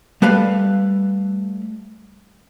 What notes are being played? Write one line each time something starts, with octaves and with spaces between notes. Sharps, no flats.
G3 A3 B4 F5 B5